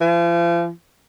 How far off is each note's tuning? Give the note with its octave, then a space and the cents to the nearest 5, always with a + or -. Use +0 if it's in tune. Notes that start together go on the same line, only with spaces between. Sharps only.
F3 -40